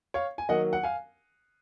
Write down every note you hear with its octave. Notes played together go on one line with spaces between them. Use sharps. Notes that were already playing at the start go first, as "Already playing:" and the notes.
C#5 F5
G#5
D#3 F#3 A#3 D#5 F#5
F#5
F5 G#5